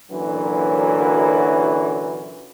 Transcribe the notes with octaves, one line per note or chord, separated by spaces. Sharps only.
F#2 A#2 D3 E3 F#3